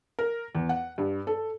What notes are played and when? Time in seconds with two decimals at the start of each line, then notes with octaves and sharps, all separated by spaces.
0.19 A#4
0.55 E2
0.69 F#5
0.98 G2
1.27 A4